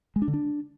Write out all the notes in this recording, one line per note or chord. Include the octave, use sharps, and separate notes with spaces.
G#3
D4
D3
D4